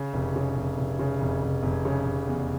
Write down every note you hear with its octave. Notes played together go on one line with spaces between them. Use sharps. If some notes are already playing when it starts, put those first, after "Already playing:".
Already playing: C#3
F1
C#3
F1
F1
C#3
F1
F1
F1
C#3
F1
E2